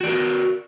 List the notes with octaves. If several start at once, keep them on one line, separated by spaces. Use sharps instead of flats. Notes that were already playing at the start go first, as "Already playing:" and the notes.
F#4 A#4 D5